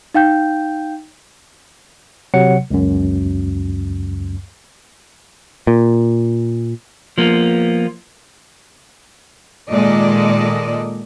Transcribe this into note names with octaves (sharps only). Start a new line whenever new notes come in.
D#4 F5 G5 G6
C3 F#3 C#5 F#5 C#7
C#2 F#2
A#2
F3 A#3 B3
A#2 D#3 G#3 A4 D5 D#5